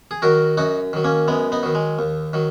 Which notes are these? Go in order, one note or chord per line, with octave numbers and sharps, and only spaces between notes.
G#4
D#3 F#3 F#4 A#4
F#2 D#4 F#4
D#3 F#3
A#3 C#4
F#2 G#3 B3
B3 D#4
D#3 F#3
G#3
D#2
D#3 F#3